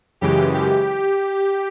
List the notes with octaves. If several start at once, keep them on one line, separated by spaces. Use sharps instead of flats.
F#2 C#3 E3 G#3 G4
G4